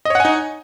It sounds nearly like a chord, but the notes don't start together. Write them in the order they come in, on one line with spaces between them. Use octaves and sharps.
D#5 C#5 F#5 G#5 D#4